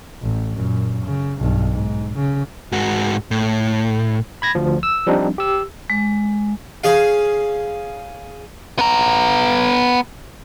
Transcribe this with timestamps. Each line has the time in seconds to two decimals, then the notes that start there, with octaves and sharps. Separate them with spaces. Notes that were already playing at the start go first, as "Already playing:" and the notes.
0.22 A1
0.56 F#2 A#2
1.04 C#3
1.40 B1 G2
1.71 G#2
2.15 C#3
2.72 G#2 F#4
3.31 A2
4.42 B5 G#6 A#6
4.55 D2 F3
4.83 E6
5.07 F3 G3 C4 D4 D#4
5.38 G4 E6
5.90 G#3
6.84 C#4 G#4 F5
8.79 B3 A#5